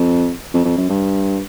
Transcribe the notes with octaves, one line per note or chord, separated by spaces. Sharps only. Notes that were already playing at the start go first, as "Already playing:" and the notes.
Already playing: F2
F2
F2
F#2
G2